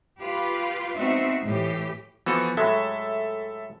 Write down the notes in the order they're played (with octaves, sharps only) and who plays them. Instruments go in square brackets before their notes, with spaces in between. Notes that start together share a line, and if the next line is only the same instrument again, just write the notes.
[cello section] F4 G4 B4
G#3 B3 C4 D#4 F#4 E5
A2 E3 G4
[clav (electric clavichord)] E3 A4 [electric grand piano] F3 B3 F#4
[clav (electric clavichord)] A2 F#3 G#3 [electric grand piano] A4 E5